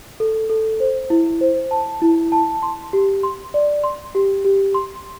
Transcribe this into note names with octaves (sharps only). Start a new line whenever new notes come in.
A4
A4
C5
E4
C5
A5
E4
A5
C6
G4
C6
D5
C6
G4
G4
C6